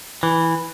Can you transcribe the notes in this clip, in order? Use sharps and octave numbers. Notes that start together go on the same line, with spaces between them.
E3